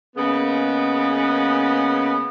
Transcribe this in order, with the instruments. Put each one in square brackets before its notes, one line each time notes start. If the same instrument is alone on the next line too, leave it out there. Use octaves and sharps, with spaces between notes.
[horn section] C#3 G#3 A#3 B3